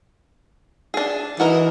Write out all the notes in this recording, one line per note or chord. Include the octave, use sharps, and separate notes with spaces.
D4 G#4
E3 F#4 A#4 D#5